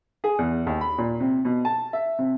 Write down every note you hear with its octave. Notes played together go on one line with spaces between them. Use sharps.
G#4
E2
D#2
B5
A#2
C3
B2
A5
E5
C3